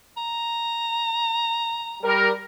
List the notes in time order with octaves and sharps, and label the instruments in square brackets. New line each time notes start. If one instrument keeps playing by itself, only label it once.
[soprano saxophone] A#5
[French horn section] G3 A#4